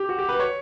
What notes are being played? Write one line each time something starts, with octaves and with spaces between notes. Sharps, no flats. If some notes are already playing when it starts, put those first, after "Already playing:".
Already playing: G4
F#4
G4
B4
C#5